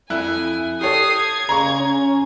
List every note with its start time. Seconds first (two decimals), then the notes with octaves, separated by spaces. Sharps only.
0.10 F2 E4 G#5 F#6
0.81 G4 A4 C#5 D#6 C7
1.18 G#6
1.49 C#3 A#5 C6 C#6
1.80 C#4